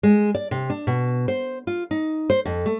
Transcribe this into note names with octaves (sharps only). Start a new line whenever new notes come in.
G#3
D5
C3
D4
B2
C5
F4
D#4
C5
F2
A3